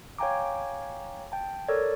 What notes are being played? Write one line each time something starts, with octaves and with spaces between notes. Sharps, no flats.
C#5 F5 G5 G#5 A#5 D6
G5 A5
A4 A#4 C#5 D5